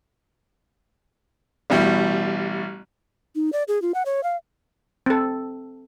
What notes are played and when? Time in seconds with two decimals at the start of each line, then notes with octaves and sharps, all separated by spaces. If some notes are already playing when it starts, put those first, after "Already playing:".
1.70 A1 B2 G3 E4
3.35 D#4
3.53 D5
3.68 G#4
3.82 F4
3.94 F#5
4.06 C#5
4.23 F5
5.06 C4 A4